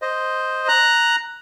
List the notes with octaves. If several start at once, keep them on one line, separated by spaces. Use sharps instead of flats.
C5 D#5
A#5 F#6